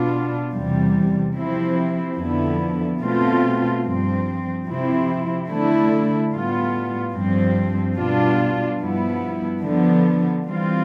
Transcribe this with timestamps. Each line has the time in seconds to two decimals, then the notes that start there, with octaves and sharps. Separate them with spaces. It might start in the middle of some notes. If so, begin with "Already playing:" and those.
Already playing: B2 B3 D4 F4
0.53 E2 C3 G3
1.36 C3 F3 C4 E4
2.18 F2 D3 F3 B3 E4
3.01 B2 A3 C4 F4
3.84 G2 F3 C4
4.66 C3 F3 C4 E4
5.48 D3 A3 E4
6.31 A2 G3 B3 F4
7.14 G2 F3 C4
7.97 B2 G3 D4 F4
8.80 G2 F3 B3 E4
9.61 D3 F3 B3
10.45 E3 G3 C4 F4